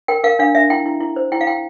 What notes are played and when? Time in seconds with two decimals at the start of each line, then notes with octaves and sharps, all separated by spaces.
0.08 A#4 G5
0.24 A#4 F5
0.39 D4 F5
0.55 D4 E5
0.70 E4 G5
0.86 E4
1.01 E4
1.16 C5
1.32 E4 G5
1.41 F5
1.47 E4 G5